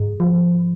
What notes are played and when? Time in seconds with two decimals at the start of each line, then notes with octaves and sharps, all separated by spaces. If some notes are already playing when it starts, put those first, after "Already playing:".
Already playing: G#2 G#4
0.20 F3